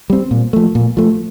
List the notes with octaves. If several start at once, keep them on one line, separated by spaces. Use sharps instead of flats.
G3 C4
A#2
F3 A3
A#2
F3 A3